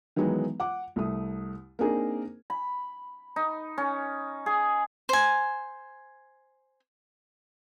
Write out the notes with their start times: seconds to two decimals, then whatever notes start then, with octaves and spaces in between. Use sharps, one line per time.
0.16 D#3 E3 F#3 G#3 B3 D#4
0.60 F#5 D6
0.96 C2 A3 D#6
1.79 A#3 C4 D4 D#4 G#4 A#4
2.50 B5
3.36 D#4
3.78 C#4
4.46 G#4
5.09 C5 G#5